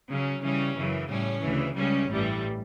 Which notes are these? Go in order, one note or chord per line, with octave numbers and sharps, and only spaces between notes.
C#3 F#3 C#4
C#3 E3 G3 C#4
F#2 C#3 E3
A2 G3 C#4
D2 C#3 E3
C#2 C#3 G3 C#4
A1 G2 E3 G3